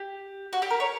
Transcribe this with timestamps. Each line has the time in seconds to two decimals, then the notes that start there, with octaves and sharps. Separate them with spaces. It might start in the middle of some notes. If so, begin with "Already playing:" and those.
Already playing: G4
0.53 F#4
0.62 G4
0.71 A#4
0.80 C#5